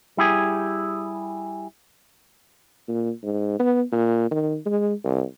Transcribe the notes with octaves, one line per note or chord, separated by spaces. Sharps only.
G3 E4 G4 G#4
A#2
G#2
B3
A#2
D#3
G#3
C2